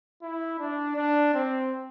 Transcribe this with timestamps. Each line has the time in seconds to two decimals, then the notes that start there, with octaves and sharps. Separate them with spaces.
0.23 E4
0.59 D4
0.97 D4
1.34 C4